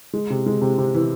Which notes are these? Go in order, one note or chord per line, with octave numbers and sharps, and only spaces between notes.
G#3
C3
G#3
C3
C3
E3